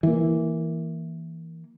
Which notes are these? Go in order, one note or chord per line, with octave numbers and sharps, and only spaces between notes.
E3 A#3